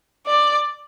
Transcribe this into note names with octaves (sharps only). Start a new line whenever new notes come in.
D5